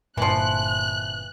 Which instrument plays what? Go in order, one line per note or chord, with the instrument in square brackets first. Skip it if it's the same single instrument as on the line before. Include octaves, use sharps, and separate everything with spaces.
[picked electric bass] G1 G2 A#2 [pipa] E3 F3 [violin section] F#6